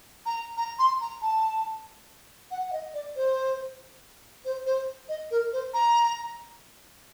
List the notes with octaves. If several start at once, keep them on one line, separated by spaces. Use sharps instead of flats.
A#5
A#5
C6
A#5
A5
F#5
F#5
D#5
D5
C5
C5
C5
D#5
A#4
C5
A#5